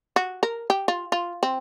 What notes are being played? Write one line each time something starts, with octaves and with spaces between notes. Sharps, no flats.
F#4
A#4
G4
F4
F4
C4